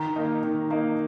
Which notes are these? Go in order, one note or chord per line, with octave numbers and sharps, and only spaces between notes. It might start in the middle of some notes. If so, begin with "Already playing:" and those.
Already playing: D#3 A#5
A#3 D#4
D#3
A#3 D#4